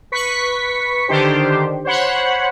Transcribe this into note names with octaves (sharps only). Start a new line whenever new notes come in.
B4 C#6 B6 C#7
D3 D#3 D4 G4 C5
C5 C#5 F#5 B5